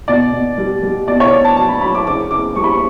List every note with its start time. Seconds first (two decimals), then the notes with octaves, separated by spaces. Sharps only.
0.08 B2 D5
0.33 B2
0.58 G3
0.83 G3
1.07 B2 D5
1.20 C#5
1.32 B2 D5
1.44 A5
1.57 F#3 A5
1.69 B5
1.81 F#3 B5
1.95 D6
2.06 C#3 D6
2.31 C#3 D6
2.56 G3 C#6
2.64 B5
2.72 C#6